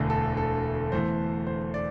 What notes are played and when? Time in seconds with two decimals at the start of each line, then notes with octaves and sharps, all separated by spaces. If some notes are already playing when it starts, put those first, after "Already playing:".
Already playing: E1 D2 D3 A3
0.10 A4
0.37 A4
0.92 E2 E3 A3 C5
1.47 C5
1.74 D5